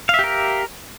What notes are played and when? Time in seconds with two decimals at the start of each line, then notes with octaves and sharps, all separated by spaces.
0.09 F5
0.14 E5
0.19 G4
0.24 A#4